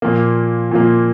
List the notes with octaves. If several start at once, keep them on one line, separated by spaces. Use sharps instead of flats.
A#2 F3 A#3
A#2 F3 A#3